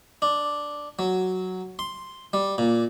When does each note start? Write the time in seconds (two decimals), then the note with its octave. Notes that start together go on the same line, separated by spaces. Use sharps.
0.22 D4
0.99 F#3
1.79 C6
2.33 G3
2.58 A#2